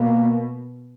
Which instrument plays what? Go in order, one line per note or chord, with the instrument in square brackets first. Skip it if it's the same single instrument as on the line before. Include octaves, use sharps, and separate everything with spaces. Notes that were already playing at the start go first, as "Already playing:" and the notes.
Already playing: [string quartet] B2 [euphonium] A#3